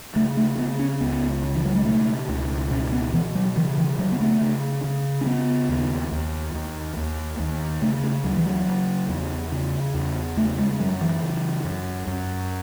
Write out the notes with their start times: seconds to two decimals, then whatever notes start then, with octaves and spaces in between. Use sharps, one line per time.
0.16 C#3 A3
0.37 A3
0.58 C#3 B3
0.79 C#4
1.01 C#2 B3
1.44 C#3
1.55 E3
1.66 F#3
1.76 G#3
1.85 B2 A3
2.28 C#2
2.71 B2 C#4
2.93 B3
3.13 B2 E3
3.35 F#3
3.56 C#3 E3
3.78 E3
3.99 C#3 F#3
4.12 B3
4.20 A3
4.41 C#3
4.84 C#3
5.21 C#4
5.26 C#3 B3
5.69 D#2
6.11 D#2
6.54 D#2
6.96 D#2
7.39 D#2
7.82 C#3 A3
8.03 A3
8.24 D#2 F#3
8.37 E3
8.46 F#3
8.67 C#3
9.09 E2
9.52 C#3
9.94 E2
10.37 C#3 A3
10.59 G#3
10.79 F#2 F#3
11.01 E3
11.22 C#3
11.65 F#2
12.07 F#2